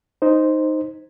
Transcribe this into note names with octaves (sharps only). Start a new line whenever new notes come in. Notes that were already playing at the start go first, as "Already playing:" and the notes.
D#4 C5